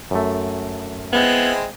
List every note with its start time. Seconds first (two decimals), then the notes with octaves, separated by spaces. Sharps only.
0.11 F#2 A3
1.13 G#3 B3 C4 E4